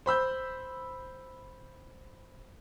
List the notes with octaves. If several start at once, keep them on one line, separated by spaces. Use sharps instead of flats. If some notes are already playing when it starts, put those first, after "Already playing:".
C5 B5 E6 G6